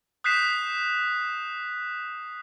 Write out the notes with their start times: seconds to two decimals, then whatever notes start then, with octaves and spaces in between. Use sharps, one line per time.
0.24 D#6 F#6 G6 B6 C7 E7